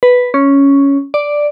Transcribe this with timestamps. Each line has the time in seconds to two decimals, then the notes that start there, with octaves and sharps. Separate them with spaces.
0.03 B4
0.34 C#4
1.14 D5